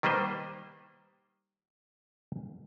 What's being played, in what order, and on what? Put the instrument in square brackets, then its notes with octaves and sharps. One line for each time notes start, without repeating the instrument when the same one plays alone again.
[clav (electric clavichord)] D#3 G3 A#3 B4 C5